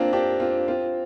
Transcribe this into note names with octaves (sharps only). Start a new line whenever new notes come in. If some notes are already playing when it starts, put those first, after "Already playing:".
Already playing: A#3 C4 D4 F4
D4 G4
C4 F4
C4 F4